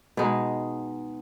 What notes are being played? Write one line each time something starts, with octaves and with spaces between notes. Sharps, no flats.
B2 G#3 D#4